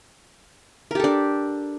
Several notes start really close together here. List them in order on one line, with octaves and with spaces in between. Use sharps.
A#4 G4 A4 D4